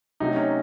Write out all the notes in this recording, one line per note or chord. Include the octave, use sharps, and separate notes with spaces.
C3 F#3 A3 D#4
C#4